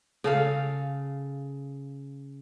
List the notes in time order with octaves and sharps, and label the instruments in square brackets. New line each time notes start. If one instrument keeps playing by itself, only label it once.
[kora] C#3 A4 F5